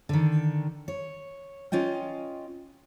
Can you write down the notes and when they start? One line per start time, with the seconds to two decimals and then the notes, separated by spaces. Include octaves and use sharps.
0.09 D3 D#3
0.88 C#5
1.72 C#4 F4 D#5 G5